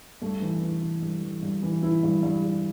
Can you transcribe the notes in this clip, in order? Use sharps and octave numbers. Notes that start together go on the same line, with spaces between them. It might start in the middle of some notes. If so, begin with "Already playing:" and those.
G2 A3
E3
E3
E3
G2
E3
G2
E3
E3 E4
G2
G2
G2